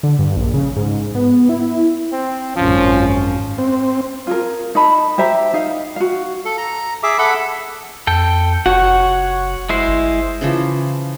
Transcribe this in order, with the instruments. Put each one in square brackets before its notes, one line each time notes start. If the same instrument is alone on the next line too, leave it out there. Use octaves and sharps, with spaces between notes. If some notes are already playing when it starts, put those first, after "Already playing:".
[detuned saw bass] D3
G2
A#1
C#3
G#2
B3
E4
[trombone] C4
[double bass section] G#1 F#2 C#4 [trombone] F3
[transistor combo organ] C4
[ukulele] F4 G#4 A#4
D#4 D#5 A5 B5
G4 C5 E5 A#5
D#4 F5
F#4 F5
[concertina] A4
A#5
G#4 E5 D6
A4 E5 F#5 B5
[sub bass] F2 [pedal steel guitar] A4 G5
[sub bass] F#1 [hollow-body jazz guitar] F#4 [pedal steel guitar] C#5 F#5
[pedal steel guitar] G#3 E4 C5
[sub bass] G1
[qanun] C#3 E3 F3